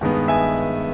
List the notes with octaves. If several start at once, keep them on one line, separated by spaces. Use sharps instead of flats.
G2 D#3 G#3 B3
E5 G#5